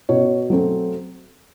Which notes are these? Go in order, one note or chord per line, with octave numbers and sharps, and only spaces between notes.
B2 C#5
F#3 A3 C4